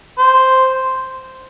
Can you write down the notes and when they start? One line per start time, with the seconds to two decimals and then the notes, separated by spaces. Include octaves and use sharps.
0.18 C5